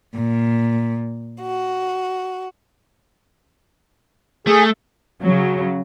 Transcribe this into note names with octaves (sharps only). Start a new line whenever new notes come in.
A#2
F#4
A3 G#4
C#3 F#3